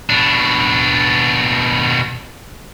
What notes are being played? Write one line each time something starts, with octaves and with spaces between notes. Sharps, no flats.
B2 D4